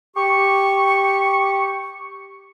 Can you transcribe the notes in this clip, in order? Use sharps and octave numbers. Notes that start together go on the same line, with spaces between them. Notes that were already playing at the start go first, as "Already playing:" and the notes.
G4 C#6